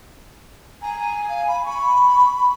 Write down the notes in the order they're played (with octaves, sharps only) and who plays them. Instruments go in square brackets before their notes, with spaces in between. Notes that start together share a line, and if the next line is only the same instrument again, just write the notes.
[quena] G#5 [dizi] A#5
[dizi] F5
B5
[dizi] B5 [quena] C#6